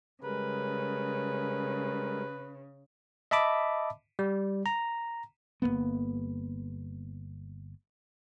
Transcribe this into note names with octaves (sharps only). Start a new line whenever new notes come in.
C#3 G3 G#3 A#4 B4
D#5 E5 A5 B5 D6
G3
A#5
G1 G#2 A#3 B3